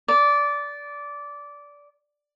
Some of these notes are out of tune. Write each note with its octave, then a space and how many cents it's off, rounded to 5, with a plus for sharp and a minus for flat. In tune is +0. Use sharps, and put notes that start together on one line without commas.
D5 -15